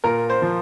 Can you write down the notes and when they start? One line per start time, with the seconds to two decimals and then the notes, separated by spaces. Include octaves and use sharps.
0.04 A#2 A#4
0.30 C5
0.42 F3